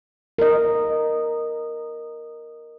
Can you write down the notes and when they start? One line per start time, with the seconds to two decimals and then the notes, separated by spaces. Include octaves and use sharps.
0.38 A#4 D#5